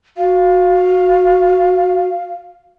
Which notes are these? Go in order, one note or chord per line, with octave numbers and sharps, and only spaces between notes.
F#4 F5